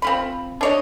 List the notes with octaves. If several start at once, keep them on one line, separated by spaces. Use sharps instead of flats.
C4 F4 B5
D4 C#5 D#5